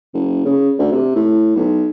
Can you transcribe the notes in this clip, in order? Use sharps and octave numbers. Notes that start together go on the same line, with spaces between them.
F#1
C#3
D2
C3
A2
B1